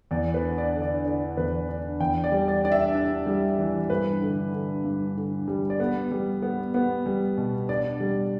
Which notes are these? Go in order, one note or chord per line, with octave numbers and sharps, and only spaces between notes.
E2 D5
B4
D4
D5
D3
D5
D3 D5
E2 B4
D4
E2 G5
D5
G3
D5
D4 D5
E5
D4
G3
E3
G2 B4
D3
D3
G2
D3
G3
D5
B3 B4
G3
B3
B3
G3
B2
D4 D5
G3